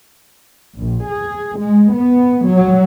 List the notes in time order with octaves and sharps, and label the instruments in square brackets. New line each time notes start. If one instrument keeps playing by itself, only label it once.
[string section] A#1
G#4
G#3
B3
F#3